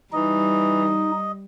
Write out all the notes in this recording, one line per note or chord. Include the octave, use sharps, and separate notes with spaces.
E3 G3 D#4 D#5